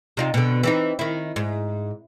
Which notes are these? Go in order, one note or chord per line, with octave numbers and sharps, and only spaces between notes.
C3 D#4 F4
B2 D3
E3 C4 D#4
D#3 E4
G#2